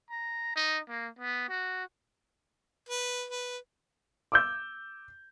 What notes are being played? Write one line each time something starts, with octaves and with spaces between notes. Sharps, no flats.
A#5
D#4
A#3
B3
F#4
B4
B4
D6 E6 G6